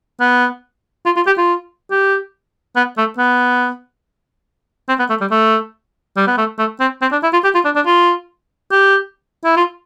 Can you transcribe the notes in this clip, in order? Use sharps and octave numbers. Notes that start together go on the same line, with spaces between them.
B3
F4
F4
G4
F4
G4
B3
A3
B3
C4
B3
A3
G3
A3
G3
B3
A3
A3
C4
C4
D4
E4
F4
G4
F4
D4
D4
F4
G4
E4
F4